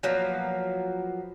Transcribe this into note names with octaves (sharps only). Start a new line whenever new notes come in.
F3 F#3 A#3 B3